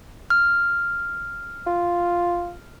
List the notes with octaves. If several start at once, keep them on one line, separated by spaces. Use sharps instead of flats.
F6
F4